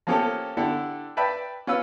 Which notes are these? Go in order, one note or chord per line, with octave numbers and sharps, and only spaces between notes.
F3 A#3 C#4 G4 A4
D3 D4 E4 G4 A4
B4 D5 E5 G5 A5 B5
C#4 F4 B4 E6